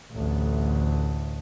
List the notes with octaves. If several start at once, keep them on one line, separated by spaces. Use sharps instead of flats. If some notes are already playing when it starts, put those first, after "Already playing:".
A1 D2